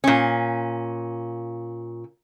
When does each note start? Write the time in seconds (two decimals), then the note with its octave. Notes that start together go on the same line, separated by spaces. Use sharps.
0.04 A#2 C#4